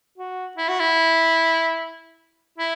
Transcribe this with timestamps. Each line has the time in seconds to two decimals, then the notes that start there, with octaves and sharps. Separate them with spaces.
0.18 F#4
0.57 E4
0.68 F#4
0.80 E4
2.58 E4